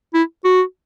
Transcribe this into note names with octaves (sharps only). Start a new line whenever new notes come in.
E4
F#4